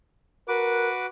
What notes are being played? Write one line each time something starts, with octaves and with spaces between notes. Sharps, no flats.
F#4 A#4 B4 D6